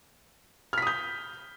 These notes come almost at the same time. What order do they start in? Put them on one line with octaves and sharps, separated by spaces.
F6 B6 D#6 G6